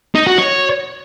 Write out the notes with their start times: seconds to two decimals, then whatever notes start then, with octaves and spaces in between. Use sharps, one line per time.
0.15 D#4
0.26 F#4
0.38 C#5